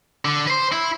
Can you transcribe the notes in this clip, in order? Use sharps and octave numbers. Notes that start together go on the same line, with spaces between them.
D3
B4 C5
E4